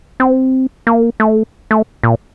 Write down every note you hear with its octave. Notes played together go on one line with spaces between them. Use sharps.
C4
A#3
A3
A3
A#2